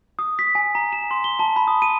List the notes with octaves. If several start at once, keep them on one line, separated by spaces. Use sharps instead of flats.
D#6
B6
G#5
A#5
E7
C6
G7
A5
B5
D#6
D#7